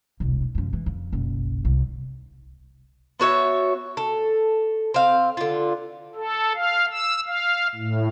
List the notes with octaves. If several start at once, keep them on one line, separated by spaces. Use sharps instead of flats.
E1 C2
F#2 F3
E3
F2
F#1 B1
C2
B3 F#4 C#5 E5
A4
C4 F5
D3 F4
A4
F5
E6
F5
A2